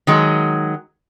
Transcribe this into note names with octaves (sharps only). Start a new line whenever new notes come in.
D#3 F#3 G#3